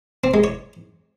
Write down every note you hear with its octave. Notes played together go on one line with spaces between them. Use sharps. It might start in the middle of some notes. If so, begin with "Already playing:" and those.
C4
G#3
C#5